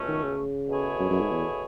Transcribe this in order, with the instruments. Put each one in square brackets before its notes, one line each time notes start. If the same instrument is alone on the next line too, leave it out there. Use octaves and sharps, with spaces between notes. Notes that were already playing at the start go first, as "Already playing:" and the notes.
Already playing: [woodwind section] C#2 B2 A3 C#4
[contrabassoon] D#3
C#3
[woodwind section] B2 A3 E4 G#4 C#5
[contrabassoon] F#2
F#2
G#2
E2